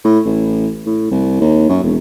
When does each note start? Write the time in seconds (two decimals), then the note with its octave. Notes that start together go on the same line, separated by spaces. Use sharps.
0.05 A2
0.25 A1
0.86 A2
1.11 C2
1.41 D#2
1.69 F#2
1.83 E1